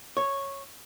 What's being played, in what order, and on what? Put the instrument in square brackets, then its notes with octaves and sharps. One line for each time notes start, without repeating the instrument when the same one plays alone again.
[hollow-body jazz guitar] C#5